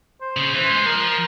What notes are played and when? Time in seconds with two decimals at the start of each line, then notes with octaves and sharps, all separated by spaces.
0.21 C5
0.37 C#3
0.53 E3 C5
0.70 G#3
0.86 F3 A#4